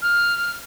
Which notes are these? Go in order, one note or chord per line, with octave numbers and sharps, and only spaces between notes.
F6